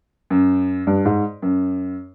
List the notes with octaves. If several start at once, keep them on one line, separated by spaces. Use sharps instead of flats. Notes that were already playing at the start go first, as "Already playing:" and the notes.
F#2
G2
G#2
F#2